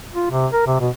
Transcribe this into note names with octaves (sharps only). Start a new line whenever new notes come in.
F4
C3
A#4
C3
B2